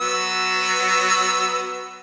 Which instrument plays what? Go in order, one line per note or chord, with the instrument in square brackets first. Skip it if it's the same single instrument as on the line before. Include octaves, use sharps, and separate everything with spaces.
[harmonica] F#3 B3 E6